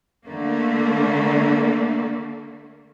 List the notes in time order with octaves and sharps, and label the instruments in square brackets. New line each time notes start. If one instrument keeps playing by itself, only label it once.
[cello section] D3 A3 A#3